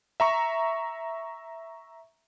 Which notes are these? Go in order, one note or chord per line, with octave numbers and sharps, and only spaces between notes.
E5 A#5 C#6